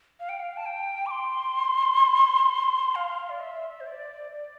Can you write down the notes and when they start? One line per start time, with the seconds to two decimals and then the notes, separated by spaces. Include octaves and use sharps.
0.20 F5
0.29 G5
0.40 F5
0.57 A5
0.66 G5
1.06 D6
1.11 C6
2.95 F5
3.30 D5
3.40 E5
3.80 C5
3.86 D5
4.32 D5